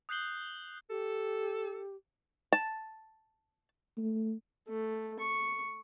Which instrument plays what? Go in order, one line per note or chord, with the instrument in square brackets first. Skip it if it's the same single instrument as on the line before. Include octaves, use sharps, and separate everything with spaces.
[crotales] D#6 F#6 G6 C7 F#7 G7
[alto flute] G4 [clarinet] A4
[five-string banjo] A5
[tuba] A3
[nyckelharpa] A3
C#6